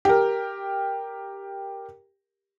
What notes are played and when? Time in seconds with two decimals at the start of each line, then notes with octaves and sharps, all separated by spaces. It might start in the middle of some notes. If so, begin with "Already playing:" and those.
0.05 G4 A#4